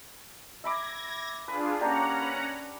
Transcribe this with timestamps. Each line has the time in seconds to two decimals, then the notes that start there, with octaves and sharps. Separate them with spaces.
0.64 E5 B5 D6 G#6 A#6
1.48 D4 F4 G#4 B4
1.81 A#3 C#4 D4 G4 F#5 A#5
2.21 B4